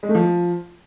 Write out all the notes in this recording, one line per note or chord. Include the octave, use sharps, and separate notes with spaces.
G#3
A3
F3